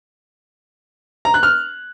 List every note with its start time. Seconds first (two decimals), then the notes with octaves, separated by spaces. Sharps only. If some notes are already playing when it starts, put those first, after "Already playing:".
1.25 A#5
1.34 F#6
1.43 F6